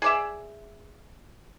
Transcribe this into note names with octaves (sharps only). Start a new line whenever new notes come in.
G#4 D5 E5